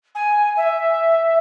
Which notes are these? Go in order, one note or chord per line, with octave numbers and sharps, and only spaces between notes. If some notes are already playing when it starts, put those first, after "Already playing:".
G#5
E5